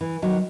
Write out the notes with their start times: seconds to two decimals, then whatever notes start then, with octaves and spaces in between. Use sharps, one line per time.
0.01 E3
0.22 D#3 F#3